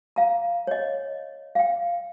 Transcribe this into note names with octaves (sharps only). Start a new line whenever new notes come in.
F5 A#5
C#5 D#5
F5 G5